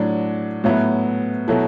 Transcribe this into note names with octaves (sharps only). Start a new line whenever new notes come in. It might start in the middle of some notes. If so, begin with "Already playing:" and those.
Already playing: A2 F#3 D4
A2 F#3 B3 E4
B2 F#3 A3 E4